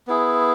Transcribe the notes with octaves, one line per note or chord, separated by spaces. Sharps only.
B3 E4 G#4